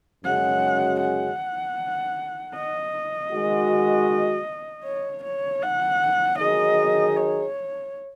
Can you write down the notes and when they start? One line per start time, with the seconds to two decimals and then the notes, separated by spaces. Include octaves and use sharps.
0.24 F#2 C#3 G#3 C#4 F#4 F#5
1.00 F#5
2.55 D#5
3.31 D#3 G#3 F#4
4.85 C#5
5.24 C#5
5.63 F#5
6.39 D#3 F#3 D#4 G#4 D#5
7.16 C#5